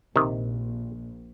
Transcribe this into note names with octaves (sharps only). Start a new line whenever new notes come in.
A#1 C3 D#3